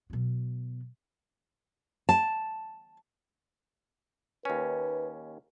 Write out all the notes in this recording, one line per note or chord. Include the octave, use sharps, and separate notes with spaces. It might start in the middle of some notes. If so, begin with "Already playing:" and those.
B2 F#3
A5
D#2 C#4 B4